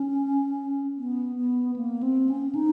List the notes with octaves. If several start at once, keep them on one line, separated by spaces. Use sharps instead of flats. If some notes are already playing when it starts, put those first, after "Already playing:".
Already playing: C#4
B3
B3
A#3
C4
C#4
D#4